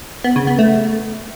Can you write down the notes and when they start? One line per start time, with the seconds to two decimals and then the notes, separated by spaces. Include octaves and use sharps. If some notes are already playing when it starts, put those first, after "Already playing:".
0.24 B3
0.36 C#3
0.47 B3
0.59 A3